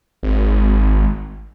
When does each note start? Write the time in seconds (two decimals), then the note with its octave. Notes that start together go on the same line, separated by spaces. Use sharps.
0.23 G#1